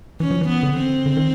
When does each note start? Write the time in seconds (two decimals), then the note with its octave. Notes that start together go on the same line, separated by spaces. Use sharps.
0.20 E3 C#4
0.31 F3
0.41 E3
0.49 B3
0.63 D3
0.77 C4
1.06 D3
1.17 D#3